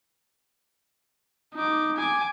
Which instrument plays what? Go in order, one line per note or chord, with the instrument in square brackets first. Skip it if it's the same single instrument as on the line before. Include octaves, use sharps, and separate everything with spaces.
[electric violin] D#4 D6
G#5 D6